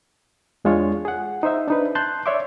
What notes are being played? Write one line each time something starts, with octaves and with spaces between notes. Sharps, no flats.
E2 G#3 D4 F4 C#5
G#4 F#5
D#4 C5 E5
D4 D#4 B4
A5 C6 F#6 G6
C#5 D5 E5 C6 D6